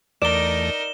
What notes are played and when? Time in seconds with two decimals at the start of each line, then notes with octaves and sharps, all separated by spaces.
0.22 E2 A3 D#4 A#4 D5 E7 G7